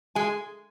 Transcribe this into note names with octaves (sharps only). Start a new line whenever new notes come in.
G#3 G#5